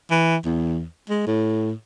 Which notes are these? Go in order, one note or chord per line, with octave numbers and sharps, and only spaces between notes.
E3
E2
G#3
A2